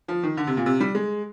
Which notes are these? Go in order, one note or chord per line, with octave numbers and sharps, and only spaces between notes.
F3
D#3
D3
C3
A#2
C3
G3
G#3